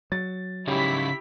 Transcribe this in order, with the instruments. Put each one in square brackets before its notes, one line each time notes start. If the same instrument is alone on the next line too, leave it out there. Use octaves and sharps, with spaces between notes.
[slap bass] F#3 [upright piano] A6
[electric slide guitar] C#3 C#4 D#4 [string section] E4 B6 [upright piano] G4